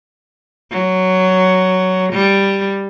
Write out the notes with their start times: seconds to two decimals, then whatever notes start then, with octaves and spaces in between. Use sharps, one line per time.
0.71 F#3
2.13 G3